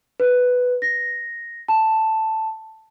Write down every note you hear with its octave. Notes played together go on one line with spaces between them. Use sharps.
B4
A#6
A5